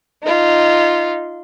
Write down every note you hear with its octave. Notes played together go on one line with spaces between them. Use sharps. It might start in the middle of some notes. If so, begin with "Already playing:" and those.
D#4 F4